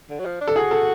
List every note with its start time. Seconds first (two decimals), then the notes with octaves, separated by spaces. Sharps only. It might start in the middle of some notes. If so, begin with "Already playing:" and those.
0.10 D3
0.19 F#3
0.25 F3
0.41 D4
0.47 A4
0.56 F#4 G#4
0.71 A4